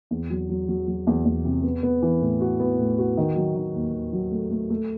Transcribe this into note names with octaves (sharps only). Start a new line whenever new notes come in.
E2
F#3
F#3
F#3
F#3
E2
E2
C3
B3
B3
E3
A2
F#4
B3
A2
F#4
D#3
F#3
D#3
D#2
D#2
F#3
A3
A3
A3